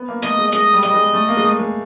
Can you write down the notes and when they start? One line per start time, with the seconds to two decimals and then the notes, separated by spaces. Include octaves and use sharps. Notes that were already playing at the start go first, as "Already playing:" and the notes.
Already playing: B3
0.09 A#3
0.23 A3 D#5
0.38 G#3
0.53 G#3 D#5
0.73 G3
0.84 G3 D#5
0.94 G#3
1.13 A3
1.29 A#3
1.37 G#3
1.44 A3
1.59 G#3